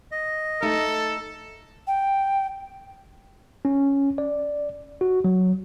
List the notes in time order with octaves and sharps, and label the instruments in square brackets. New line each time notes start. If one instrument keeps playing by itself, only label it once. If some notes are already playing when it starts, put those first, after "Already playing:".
[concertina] D#5
[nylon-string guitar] A3 D#4 [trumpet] A4
[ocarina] G5
[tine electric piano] C#4
D5
F#4
F#3